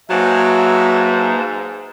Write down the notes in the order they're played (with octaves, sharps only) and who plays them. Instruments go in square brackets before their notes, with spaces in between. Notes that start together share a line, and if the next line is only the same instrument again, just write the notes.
[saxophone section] G#2 [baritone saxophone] F#3 [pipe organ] A#3 B4 A5 [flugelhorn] E5